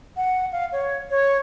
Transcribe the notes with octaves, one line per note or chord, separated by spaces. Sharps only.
F#5
F5
C#5
C#5